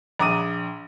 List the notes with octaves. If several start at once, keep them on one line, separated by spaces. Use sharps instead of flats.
A#1 A#5 D6 D#6 D#7